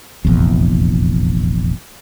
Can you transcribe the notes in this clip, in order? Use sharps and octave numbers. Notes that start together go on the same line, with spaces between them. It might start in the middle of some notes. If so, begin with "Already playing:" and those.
F1 A#1 E2